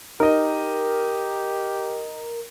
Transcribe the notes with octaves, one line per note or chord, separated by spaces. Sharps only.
D#4 G4 A#4 D#5